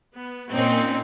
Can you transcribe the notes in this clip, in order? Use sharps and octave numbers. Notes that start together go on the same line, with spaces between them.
B3
A#2 A#3 C4 C#4 D#4